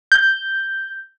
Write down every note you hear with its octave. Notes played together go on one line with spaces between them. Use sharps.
G6